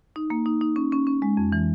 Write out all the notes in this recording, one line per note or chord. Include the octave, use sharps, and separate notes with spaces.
D#4
A#3
D#4
D#4
C#4
C#4
C#4
G#3
F2
E3